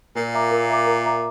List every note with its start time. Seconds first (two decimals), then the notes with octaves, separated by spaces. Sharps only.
0.17 A#2 A#4
0.35 E5 A#5 D6
0.51 A#4
0.70 E5 A#5 D6
0.87 A#4
1.05 E5 A#5 D6